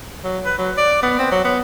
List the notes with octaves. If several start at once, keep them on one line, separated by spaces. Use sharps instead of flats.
F#3
B4
F#3
D5
B3
C4
F#3
B3